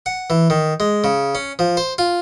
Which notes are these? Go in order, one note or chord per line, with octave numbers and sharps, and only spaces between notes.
F#5
E3
D#3
G#3
C#3
C#4
F3
C5
F4